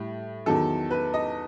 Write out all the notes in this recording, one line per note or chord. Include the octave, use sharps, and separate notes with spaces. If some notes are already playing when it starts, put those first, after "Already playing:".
Already playing: A2 G3
E2 D#3 F#3 A4
B4
D#5